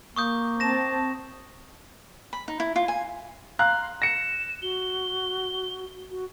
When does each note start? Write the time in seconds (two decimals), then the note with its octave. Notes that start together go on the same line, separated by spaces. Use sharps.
0.16 A#3 C#6 D#6 G6
0.60 C4 A5 A#6 E7
2.33 B5
2.48 D#4
2.60 E4
2.76 F4
2.88 G#5
3.59 F5 A#5 C6 F#6
4.02 A#6 C#7 E7
4.62 F#4 G7
6.11 F#4